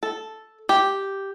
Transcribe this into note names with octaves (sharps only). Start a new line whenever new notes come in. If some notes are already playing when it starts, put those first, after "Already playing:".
A4
G4